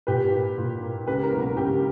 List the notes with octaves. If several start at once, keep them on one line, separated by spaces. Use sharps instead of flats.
A#2 G4 B4
A#3
A#2
A#3
C#2 G4 B4
A#4
B2 F#3 A#3
A#4
C#2 G4